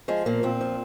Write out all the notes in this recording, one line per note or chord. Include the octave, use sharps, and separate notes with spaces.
F3 G#3
A#2 A#3
A#2 C4
F3